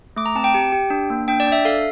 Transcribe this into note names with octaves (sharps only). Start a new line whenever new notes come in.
A3 D6
A#5
C4 A5
G5
G4
G4
D4
A#3
D4 G5
D5
D4
E5
A4 F5